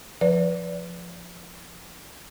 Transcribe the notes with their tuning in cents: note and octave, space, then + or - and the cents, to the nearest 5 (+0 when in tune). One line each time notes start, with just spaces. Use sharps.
F3 +0 B4 +0 D5 -30